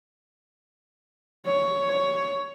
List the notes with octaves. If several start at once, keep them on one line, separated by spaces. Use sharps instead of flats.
C#5